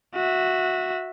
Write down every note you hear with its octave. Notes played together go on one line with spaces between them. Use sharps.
F#4 E5